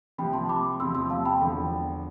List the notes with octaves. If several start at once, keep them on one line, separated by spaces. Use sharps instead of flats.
C2 C3 F3 G5 B5
A5 C6
B5 D6
E2 C3 F3 C6 E6
C6 E6
F5 A5
G5 B5
E1 E2 D3 F3